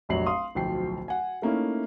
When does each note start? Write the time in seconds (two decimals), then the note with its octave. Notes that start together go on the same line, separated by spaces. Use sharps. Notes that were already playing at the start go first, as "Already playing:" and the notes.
0.09 F1 A#1 F#3 C7 F#7
0.26 F5 C6 D#6
0.55 D1 B1 F3 G5 C7
1.08 F#5 G#5
1.42 A3 A#3 C#4 D#4 E4